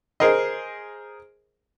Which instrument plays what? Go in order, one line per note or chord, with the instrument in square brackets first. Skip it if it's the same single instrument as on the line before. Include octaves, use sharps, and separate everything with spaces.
[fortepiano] G#4 A#4 C5 D#5